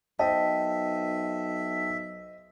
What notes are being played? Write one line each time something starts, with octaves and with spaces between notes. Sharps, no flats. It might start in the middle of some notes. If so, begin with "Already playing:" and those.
B1 C5 D#5 E5 G5 A5